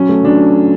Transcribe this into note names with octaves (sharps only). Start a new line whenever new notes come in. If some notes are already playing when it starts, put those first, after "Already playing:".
Already playing: F#3 C#4
A3
F#3 D4